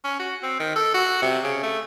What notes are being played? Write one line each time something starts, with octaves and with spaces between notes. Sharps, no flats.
C#4
F#4
C4
D#3
A4
F#4
C3
C#3
A3